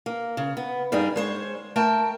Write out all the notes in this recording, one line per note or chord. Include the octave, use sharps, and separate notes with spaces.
A#3
C#3
B3
G2 G3 D#4 G#4
G#3 C5 C#5
A3 A#4 G5 A5